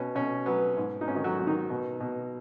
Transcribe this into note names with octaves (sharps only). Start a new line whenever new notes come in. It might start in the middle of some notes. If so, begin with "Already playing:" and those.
Already playing: B2 C#4
B2 C#4
F#3 B3
G#2
D#4
G#2 C#4
D#3 D#4
F#3 F#4
F#3
D#3 D#4
B2
B2